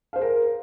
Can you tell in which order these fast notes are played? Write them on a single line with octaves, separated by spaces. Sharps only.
F5 C5 G#4 A#4